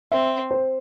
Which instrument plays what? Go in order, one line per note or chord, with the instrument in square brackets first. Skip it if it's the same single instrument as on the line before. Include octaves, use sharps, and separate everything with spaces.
[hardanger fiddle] C4 [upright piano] E5
[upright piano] C5